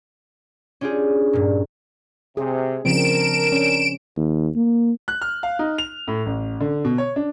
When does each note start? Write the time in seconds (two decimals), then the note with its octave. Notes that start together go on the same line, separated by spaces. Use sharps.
0.81 C#4 D4 F4 G4 G#4
1.33 G2 A#2
2.37 C3 G#4
2.85 C#3 F3 C4 D4 A#4 D7 E7
3.52 C#4
4.17 D#2
4.56 A#3
5.08 F#6
5.22 F6
5.43 F5
5.59 D#4
5.78 F7
6.07 A2
6.26 A1
6.60 D3
6.85 B2
6.98 C#5
7.16 D4